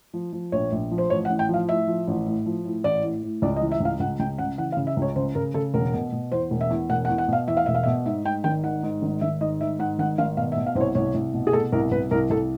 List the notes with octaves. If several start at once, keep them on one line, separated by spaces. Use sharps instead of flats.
F3
F3
A#1 C#5
A#1
F3
C5
A1 C#5
F#5
A1
G5
F3 F5
A2 E5
F3
A1
A2
F3
A2
A1 D5
A2
A2
C#2 D5
D#5
E3
E5
C#2 F5
C#2 F#5
C#2 G5
C#3 F#5
E3 F#5
F5
C#3
E5
C#2 C#5
C#3 C5
C#3 A#4
C#3 A4
E1 A#4
B2
B2
E2 C5
E1
E5
E2
E1 F#5
F#5
E2
F#5
B2 F5
E2 E5
F5
E1 E5
F5
E5
B2
G#2 E5
G#2 G5
G#1 G5
D#3 F#5
G#2
G#1
G#1 E5
G#2 D#5
D#3 E5
G#2 F#5
G#1 F#5
G#1 F5
B2 F5
E5
B2
F5
C2 C5
C#5
C2 C#5
C2
B2
G#4
B2 A4
C2 A#4
C2 B4
C2 A#4
C2 A4